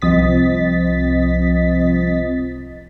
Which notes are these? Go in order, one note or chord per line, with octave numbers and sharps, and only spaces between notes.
C2 F3 C4 D#5 A6 B6